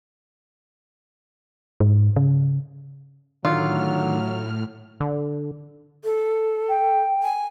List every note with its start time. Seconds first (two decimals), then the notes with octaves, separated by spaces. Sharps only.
1.80 G#2
2.16 C#3
3.45 A2 D3 D#3 F#3 F4 F6
5.00 D3
6.04 A4
6.69 G5
7.23 G#5